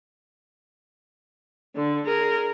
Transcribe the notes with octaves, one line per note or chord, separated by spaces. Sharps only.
D3
G#4 A#4